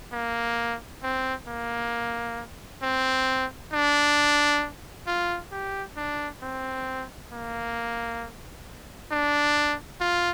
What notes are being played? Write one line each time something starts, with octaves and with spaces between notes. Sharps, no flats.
A#3
C4
A#3
C4
D4
F4
G4
D4
C4
A#3
D4
F4